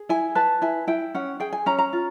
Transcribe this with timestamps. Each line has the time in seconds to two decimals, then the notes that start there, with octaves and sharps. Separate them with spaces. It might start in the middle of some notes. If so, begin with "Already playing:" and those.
Already playing: G#4
0.09 E4 G#5
0.35 B4 A5
0.62 E4 G#5
0.87 E4 G5
1.15 C#4 F#5
1.40 G#4 G5
1.52 G#5
1.66 C#4 A#5
1.79 A#5
1.93 F4